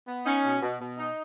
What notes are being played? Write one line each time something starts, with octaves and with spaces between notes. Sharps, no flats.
B3
C#4 D#4
B2
B2
B2
D#4